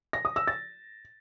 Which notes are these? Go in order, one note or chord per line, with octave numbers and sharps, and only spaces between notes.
A#6
D#6
E6
A6